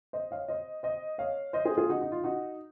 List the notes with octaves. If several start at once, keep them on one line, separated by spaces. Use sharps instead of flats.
C5 D#5
C#5 F5
C5 D#5
C5 D#5
C#5 F5
C5 D#5
G#4 C5
F4 G#4
D#4 F#4
D#4
F4
D#4 F#4